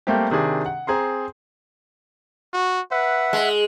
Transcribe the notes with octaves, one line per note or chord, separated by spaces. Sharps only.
G3 A3 A#3 C4 G4
C3 D#3 D4 G#4
F#5
C4 G#4 A#5 C6
F#4
B4 E5 F#5
G#3